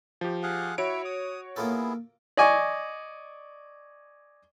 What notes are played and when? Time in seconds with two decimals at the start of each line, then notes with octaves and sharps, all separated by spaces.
0.21 F3 G4
0.43 G#4 F5 F#5
0.78 E4 F#4 C#5 E5 D7
1.05 D#6
1.56 A#3 B3 E4 F4 G#4 A4
2.37 D5 D#5 G#5 C#6